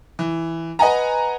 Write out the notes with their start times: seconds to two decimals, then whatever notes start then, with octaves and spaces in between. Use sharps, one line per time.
0.19 E3
0.79 B4 D#5 F#5 G#5 A#5